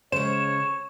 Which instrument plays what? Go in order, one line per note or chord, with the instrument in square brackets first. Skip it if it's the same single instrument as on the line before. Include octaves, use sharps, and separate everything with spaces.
[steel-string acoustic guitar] C#3 G#3 [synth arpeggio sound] C5 [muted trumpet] C#5 [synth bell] E7